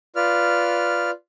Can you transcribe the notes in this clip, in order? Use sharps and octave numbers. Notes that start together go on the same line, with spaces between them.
F4 B4 D5 F6